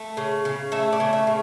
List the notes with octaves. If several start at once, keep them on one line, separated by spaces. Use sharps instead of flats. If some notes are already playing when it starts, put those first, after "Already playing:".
Already playing: A3
C#3
C#3
A3 E5
D5
C#3
E5
C#3